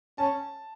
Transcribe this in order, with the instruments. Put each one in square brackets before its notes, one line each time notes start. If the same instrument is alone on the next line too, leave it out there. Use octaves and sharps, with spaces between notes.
[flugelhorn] C#4 [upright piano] A5